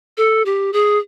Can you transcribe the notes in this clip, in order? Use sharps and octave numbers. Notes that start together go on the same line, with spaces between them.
A4
G4
G#4